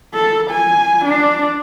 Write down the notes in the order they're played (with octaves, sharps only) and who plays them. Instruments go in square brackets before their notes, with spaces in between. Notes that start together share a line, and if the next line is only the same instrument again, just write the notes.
[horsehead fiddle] A4
G#5
D4